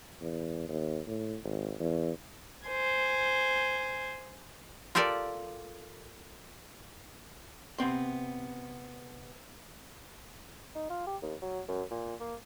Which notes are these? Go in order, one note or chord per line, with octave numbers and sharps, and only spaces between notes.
E2
D#2
A2
G#1
E2
C5 G#5
F4 G4 A4 A#4 D5
C3 B3 C4 C6
D#4
F4
G4
D#2
F#3
F#2
A#2
A#3